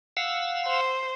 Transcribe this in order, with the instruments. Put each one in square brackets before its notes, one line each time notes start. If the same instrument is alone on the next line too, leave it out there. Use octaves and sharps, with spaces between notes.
[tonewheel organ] F5 F#5 E6
[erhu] C5